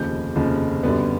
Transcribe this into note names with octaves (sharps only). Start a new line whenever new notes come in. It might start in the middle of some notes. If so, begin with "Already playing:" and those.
Already playing: F1 D#2 C#3 F3 G6
F1 D#2 C#3 F3
F#2 D3 G3 B3